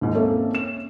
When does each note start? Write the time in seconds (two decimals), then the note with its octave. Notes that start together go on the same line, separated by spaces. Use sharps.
0.01 D#2 G#2
0.14 A#3 C4 C#4 A4 C#5 E5
0.55 C#4 E7